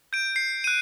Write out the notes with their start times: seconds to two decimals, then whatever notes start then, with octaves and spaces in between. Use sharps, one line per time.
0.13 G6 D7
0.36 C7
0.64 F#6 D#7